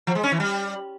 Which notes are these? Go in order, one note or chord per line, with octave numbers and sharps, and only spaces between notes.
F3
G#3
C#4
E3
G3